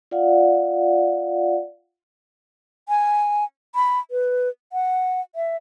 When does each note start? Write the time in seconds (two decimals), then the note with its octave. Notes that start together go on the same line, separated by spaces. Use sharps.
0.11 F4 D5 F5 F#5
2.89 G#5
3.75 B5
4.11 B4
4.73 F#5
5.35 E5